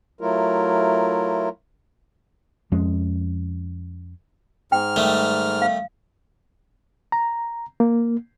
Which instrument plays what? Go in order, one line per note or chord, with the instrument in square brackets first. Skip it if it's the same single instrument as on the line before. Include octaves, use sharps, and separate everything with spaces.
[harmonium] F#3 A3 E4 F4 A#4
[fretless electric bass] F2 F3 G#3 C#4
[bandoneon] G#2 F6 [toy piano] G5
[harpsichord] D#3 G3 A3
[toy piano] F5
[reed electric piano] A#5
A#3